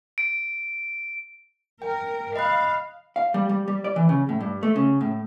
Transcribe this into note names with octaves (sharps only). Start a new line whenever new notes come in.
D7
A#4 G5
D#5 F5 B5 F#6
F5
G3
G3
G3
D5
E3
C#3
A2
G2
A3
C#3
A2